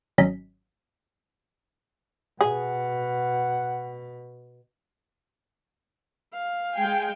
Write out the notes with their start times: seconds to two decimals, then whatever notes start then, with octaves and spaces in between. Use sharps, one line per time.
0.18 G#1 F#3 C#4 D#5 B6
2.41 B2 G#4 F#5
6.33 F5
6.75 G#3 G5 G#5